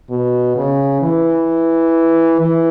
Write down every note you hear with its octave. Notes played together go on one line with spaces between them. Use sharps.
B2
C#3
E3
E3